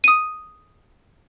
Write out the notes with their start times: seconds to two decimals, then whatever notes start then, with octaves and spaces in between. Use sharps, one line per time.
0.04 D#6 D#7